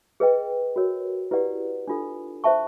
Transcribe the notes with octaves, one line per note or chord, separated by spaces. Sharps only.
G#4 B4 D#5 G5
F#4 A#4 C#5
E4 G4 B4 D5 F#5
D4 F4 A4
C5 E5 A5 C#6